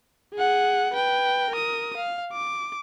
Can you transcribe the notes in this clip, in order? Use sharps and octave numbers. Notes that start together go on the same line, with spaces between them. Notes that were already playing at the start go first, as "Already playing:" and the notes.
G#4 F#5
B4 G5
A#4 D#6
F5
D6